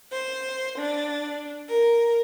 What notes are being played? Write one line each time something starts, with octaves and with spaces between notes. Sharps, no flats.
C5
D4
A#4